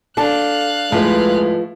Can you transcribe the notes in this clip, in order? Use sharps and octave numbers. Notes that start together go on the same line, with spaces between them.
D4 A4 F5 A5 F#6
A2 F3 G#3 A3 B4